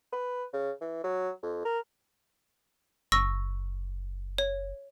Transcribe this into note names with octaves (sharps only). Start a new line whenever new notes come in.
B4
C#3
E3
F#3
F2
A#4
F#1 C#6 E6 A#6
C#5